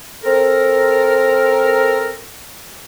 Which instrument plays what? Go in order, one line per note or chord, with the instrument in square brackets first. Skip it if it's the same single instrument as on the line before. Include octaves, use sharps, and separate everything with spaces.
[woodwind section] C4 A4 A#4